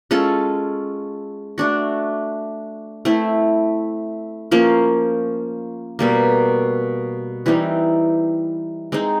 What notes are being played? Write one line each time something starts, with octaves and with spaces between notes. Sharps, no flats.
G#3 C#4 F4 A4
A3 D4 F#4
A3 C4 E4
F3 A#3 C#4 F4
B2 G3 A#3
E3 G3 C4 D#4
G#3 C4 D#4